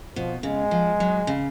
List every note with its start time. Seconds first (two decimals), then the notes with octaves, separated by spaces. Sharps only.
0.16 B2 F3
0.43 C#3 G#3
0.71 F3
1.00 F#3
1.27 C#3